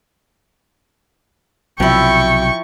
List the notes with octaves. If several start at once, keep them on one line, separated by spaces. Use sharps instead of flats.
B1 C3 F3 F#3 E4 G5 C#6